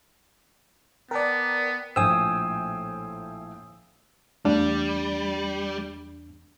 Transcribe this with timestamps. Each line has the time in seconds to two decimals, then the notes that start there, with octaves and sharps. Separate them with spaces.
1.11 B3 A#4 D5 G5 A5
1.96 A#1 A2 F3 C5 G5 G#5 D#6 E6
4.45 E2 G3 A3 D4